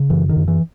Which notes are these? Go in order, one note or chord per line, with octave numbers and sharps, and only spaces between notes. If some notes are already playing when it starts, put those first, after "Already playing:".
Already playing: C#3
F#2 E3
D#3
F#2
E3